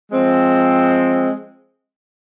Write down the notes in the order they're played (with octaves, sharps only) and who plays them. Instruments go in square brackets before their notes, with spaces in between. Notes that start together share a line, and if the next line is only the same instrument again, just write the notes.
[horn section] F3 G#3 C4